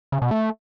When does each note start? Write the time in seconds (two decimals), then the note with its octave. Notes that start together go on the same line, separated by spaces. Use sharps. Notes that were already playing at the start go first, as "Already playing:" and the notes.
0.12 C#3
0.22 B2
0.31 A3